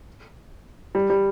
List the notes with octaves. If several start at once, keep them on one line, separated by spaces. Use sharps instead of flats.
G3
G3